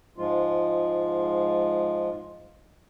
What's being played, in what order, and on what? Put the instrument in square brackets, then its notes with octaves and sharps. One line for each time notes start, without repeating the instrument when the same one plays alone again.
[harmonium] G#2 F3 G#3 F4